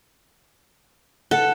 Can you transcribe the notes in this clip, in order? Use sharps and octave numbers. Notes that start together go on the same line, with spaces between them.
A4 F#5